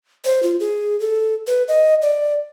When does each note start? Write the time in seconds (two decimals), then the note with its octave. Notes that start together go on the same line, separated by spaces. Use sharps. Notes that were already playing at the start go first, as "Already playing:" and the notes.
0.25 C5
0.43 F4
0.60 G#4
1.00 A4
1.47 B4
1.68 D#5
2.02 D5